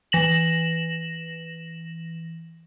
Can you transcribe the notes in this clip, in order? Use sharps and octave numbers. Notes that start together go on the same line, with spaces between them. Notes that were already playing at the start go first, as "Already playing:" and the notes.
E3 A#6 E7 F#7